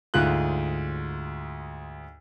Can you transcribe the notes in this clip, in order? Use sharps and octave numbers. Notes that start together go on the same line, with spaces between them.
D2 G#2 F4 F#6